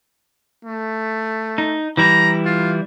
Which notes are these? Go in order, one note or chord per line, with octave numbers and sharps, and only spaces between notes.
A3
D#4
E3 G3 E4 A#5
F4